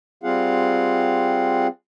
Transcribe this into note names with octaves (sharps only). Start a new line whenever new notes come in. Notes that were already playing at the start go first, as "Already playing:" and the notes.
G3 C4 F4 G#4 F5 F#5